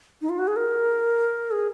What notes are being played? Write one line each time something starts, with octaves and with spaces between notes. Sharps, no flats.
D#4
F4
F#4
G#4
A#4
G#4